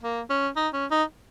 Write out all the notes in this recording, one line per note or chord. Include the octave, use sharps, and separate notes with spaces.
A#3
C#4
D#4
C#4
D#4